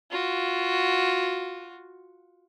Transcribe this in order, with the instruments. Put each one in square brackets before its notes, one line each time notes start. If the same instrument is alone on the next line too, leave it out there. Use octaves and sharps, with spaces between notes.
[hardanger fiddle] F4 F#4